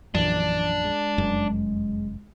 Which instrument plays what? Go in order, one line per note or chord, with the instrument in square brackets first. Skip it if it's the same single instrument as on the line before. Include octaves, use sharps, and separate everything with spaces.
[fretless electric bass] A#1 F#2 [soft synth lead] E3 [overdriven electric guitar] D4
[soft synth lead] G#3
[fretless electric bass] F1 F#2